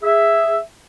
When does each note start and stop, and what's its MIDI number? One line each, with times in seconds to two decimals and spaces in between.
0.03 0.58 68
0.03 0.58 76